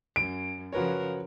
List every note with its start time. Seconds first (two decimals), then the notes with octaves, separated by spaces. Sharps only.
0.16 F#2 D7
0.73 C#3 F3 F#4 A#4 B4 C#5